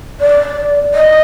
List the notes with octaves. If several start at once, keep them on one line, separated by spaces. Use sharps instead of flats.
D5
D#5